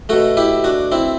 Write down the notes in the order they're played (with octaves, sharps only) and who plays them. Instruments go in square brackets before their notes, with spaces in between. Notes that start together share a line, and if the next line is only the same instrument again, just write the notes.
[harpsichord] B2 A3 F#4 A4
E4 G4
D4 F#4
C4 E4